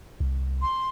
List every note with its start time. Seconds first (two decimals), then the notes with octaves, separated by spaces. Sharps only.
0.20 C2
0.60 C6